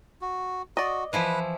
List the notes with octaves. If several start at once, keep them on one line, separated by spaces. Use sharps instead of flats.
F#4
F#4 D5 D#5
E3 F3 E4 B4